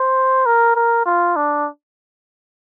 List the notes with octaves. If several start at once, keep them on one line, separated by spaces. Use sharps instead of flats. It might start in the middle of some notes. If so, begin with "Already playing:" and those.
Already playing: C5
A#4
A#4
F4
D4